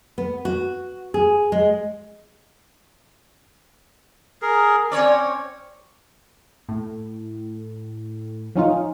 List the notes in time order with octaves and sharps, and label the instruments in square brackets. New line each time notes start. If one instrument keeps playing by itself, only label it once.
[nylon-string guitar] B3
F#4
G#4
G#3
[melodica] G#4 A#4
[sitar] C4 C#5 D5 [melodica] C#4
[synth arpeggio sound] A2
F3 C#4 D#4 F4